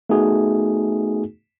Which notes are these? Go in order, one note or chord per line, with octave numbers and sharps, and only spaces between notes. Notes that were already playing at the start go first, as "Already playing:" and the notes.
A3 B3 D#4 F#4 G#4